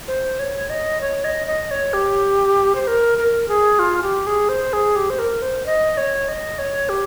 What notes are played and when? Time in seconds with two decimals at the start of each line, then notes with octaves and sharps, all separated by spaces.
0.08 C5
0.39 C#5
0.70 D#5
1.01 C#5
1.25 D#5
1.47 D#5
1.71 C#5
1.93 G4
2.75 C5
2.87 A#4
3.18 A#4
3.48 G#4
3.79 F4
4.03 G4
4.27 G#4
4.49 C5
4.73 G#4
4.96 G4
5.10 C5
5.19 A#4
5.42 C5
5.66 D#5
5.97 C#5
6.28 D#5
6.59 C#5
6.89 G4